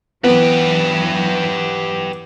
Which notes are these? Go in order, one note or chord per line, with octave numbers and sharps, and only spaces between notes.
E3 F#3 B3 G4 B4